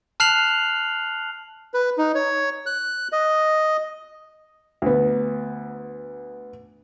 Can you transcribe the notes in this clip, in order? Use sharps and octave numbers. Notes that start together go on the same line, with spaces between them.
A5 F6 F#6 C7 F7 F#7
B4
D#4
C#5
F#6
D#5
D2 B3